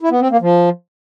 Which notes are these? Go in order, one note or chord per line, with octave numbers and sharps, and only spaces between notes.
E4
B3
C4
A#3
F3